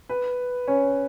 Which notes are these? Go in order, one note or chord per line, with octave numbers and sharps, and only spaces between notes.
B4
C#4 C#5